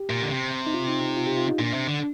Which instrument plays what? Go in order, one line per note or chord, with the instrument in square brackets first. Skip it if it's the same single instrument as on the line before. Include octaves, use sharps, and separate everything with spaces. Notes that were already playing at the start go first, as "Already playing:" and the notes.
Already playing: [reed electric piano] G4
[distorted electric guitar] A#2
D3
C3
[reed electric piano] D#4
F4
D#4
D#4
F4
G4
F4
D#4
[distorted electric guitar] A#2 [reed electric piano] D4
[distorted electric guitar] C3
D3